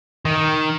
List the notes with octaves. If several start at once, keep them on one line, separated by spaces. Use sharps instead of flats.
D#3